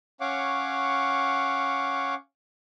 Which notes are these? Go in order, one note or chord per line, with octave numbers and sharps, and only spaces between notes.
C#4 C#5 F5 F#5 D6